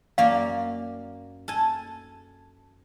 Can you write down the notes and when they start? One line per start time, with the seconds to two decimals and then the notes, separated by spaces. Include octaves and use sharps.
0.18 F#2 A#3 D5 F5
1.48 A4 G#5